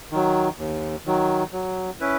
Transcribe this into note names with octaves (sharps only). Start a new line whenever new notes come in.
D#3 F#3
D#2
D#3 F#3
F#3
C#4 E4 B4